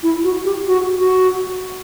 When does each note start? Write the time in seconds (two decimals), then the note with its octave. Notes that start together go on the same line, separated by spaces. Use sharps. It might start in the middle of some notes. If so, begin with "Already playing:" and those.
0.03 E4
0.24 F#4
0.45 G4
0.67 F#4
0.99 F#4